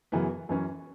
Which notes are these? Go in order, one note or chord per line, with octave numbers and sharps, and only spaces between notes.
F#2 C#3 E3 B3 E4
F#2 E3 C#4 E4